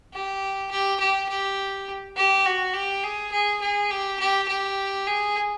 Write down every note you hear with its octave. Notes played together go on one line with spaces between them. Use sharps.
G4
G4
G4
G4
G4
F#4
G4
G#4
G#4
G#4
G4
G4
G4
G#4